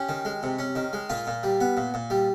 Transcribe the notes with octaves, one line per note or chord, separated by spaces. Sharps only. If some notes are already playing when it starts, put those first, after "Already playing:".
Already playing: C#4 G4
D#3
G#3
C3
C#4
D#3
G#3
A#2 F4
A#2
G3
B3
A#2
A#2
G3